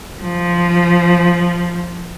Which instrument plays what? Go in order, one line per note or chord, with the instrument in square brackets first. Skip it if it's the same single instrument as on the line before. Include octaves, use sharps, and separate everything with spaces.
[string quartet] F3